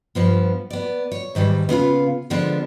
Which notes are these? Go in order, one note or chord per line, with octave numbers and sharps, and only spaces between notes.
G2 F3 B3
B3 D5
C#5
G#2 D#3 E3 G3
C#3 B3 F4 F5
D3 F3 G#3 B3 D4 F4